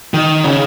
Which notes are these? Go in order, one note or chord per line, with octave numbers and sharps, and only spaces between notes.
D#3
C#3